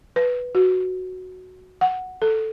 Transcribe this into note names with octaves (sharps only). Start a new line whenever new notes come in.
B4
F#4
F#5
A4